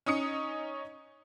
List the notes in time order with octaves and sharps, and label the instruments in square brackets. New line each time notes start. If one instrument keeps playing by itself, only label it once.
[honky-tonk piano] C#4 D#4 D#6 C#7